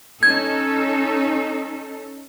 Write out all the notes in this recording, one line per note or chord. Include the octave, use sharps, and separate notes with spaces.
C#4 D#4 A4 G#6